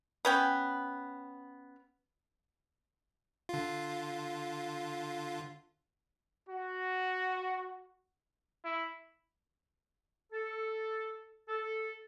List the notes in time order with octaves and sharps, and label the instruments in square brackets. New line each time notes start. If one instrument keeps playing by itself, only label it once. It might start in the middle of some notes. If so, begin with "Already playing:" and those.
[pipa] B3 C#4 G5
[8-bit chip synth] D3 F4
[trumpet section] F#4
[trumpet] E4
[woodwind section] A4
A4